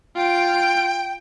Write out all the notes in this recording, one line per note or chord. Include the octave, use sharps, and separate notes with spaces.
F4 G5 D7